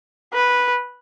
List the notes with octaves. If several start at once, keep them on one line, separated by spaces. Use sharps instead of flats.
B4